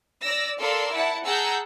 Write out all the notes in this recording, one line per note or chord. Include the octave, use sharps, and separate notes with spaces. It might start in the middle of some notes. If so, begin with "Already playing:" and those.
D5 E6 A#6
A4 A#4 D5 F5 C6 E6
E4 F#5 A5
G#4 F#5 A5 A#5 E6 G6